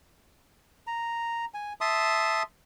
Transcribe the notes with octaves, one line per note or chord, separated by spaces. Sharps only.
A#5
G#5
E5 A5 C6 D#6